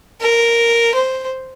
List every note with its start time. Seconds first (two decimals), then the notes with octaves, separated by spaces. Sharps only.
0.21 A#4
0.94 C5